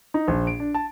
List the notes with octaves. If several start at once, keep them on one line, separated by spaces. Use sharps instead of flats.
D#4
A#1
D7
D4
A5